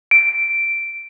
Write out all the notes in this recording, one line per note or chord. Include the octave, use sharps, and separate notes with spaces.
D7